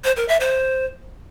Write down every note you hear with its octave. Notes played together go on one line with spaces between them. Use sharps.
C5
A#4
E5
C5